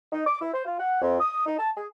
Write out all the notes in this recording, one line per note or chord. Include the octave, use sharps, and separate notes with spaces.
D#4
D6
E4
C5
F4
F#5
F2
D#6
D#4
A5
G#4